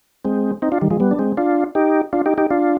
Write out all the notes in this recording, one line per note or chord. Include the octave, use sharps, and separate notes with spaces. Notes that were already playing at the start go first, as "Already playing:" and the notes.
G#3 C4
C4 D#4
D4 F4
D#3 G3
F3 G#3
G3 B3
D4
G#3 C4
D4 F4
D#4 G4
D4 F4
D#4 G4
D#4 G4
D4 F4